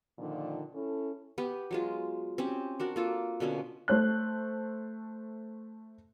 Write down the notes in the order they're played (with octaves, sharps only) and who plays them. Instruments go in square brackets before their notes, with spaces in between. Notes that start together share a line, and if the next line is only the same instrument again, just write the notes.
[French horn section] A#2 D3 D#3 F3
C#4 E4 A4
[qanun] B3 G4
F#3 G#3 F4
C4 C#4 G4
D4 F#4 A#4
A#3 F4 A4
B2 D3 A#3 C#4
[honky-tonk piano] A3 C5 F#6